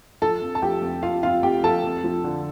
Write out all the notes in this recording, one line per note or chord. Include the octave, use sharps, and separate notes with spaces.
F3 A4 A5
F2
A5
F3 G4 G5
F2
F2 F4 F5
F2 F4 F5
F2 G4 G5
F3 A4 A5
F2
F3
D3